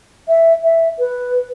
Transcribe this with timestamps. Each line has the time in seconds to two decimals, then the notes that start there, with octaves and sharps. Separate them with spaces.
0.28 E5
0.64 E5
0.99 B4